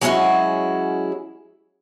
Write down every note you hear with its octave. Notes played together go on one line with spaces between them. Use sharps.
F#3 G#3 C#4 E4 F#4 G#4